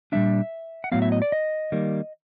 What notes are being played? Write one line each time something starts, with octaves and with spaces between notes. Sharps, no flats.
A#2 G3 B3 D4 E5
F#5
A2 F#3 B3 F5
E5
D#5
D5
D#5
D#3 G3 A#3